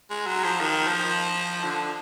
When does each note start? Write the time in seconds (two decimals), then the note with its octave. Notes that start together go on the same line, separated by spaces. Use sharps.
0.10 G#3
0.27 F#3
0.44 F3
0.61 D#3
0.87 F3
1.64 D3